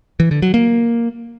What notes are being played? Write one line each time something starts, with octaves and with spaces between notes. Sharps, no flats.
E3
D3
F#3
A#3